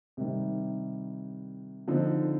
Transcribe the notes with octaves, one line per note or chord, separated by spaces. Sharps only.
C3 D#3 G3
D3 F3 C4 D#4